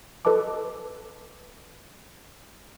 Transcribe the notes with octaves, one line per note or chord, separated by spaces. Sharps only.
A4 B4 D#5 A5 D6